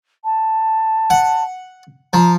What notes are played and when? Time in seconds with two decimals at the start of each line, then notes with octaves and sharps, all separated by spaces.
0.24 A5
1.10 F#5
2.13 F3 A#5